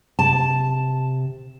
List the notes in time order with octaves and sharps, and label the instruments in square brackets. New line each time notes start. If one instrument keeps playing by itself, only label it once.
[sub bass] C3 [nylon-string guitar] A5